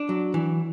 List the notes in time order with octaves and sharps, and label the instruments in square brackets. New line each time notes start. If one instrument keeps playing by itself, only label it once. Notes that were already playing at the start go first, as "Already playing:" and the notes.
Already playing: [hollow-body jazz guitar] D4
F#3
E3